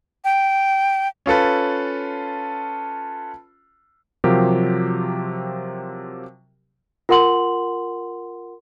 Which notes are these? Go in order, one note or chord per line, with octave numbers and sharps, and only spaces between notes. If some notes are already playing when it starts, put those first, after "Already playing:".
G5
C#4 F4 A4 B4
C3 F3 F#3 F4 G4 A#4
F4 A#4 F#5 C6 F#7